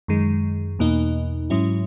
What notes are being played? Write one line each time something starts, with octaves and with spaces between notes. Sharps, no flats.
F#2 D#3 G#3
E2 B2 A#3 D#4
G#2 F#3 C#4 E4